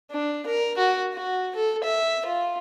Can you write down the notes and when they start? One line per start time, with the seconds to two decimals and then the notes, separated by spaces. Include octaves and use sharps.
0.11 D4
0.47 A#4
0.77 F#4
1.14 F#4
1.56 A4
1.84 E5
2.26 F4